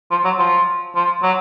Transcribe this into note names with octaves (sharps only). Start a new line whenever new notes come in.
F3
F#3
F3
F3
F#3